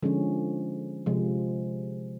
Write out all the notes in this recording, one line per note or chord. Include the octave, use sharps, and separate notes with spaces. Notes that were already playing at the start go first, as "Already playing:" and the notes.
D3 F3 G#3 C#4
C3 F3 G#3